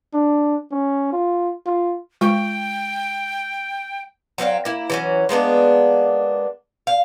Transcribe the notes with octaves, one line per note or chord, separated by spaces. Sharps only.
D4
C#4
F4
F4
G#3 F4 G5 C#6
F#3 C4 D#4 F5
A#3 E4
E3 F#3 C#4
G#3 A#3 B3 D4
F5